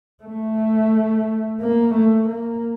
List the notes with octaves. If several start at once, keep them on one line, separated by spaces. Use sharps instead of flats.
A3
A#3
A3
A#3